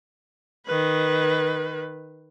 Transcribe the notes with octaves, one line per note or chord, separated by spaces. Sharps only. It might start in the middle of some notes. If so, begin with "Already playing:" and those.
D#3 B4